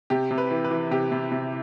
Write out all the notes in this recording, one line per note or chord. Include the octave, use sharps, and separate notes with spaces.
C3 G4
C3
B4
E3
B4
E3
C3 G4
C3
C3